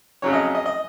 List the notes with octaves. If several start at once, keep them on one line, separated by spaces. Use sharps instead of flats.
F2 C#3 F#3 C#4 C#5
D#5
D#5
D#5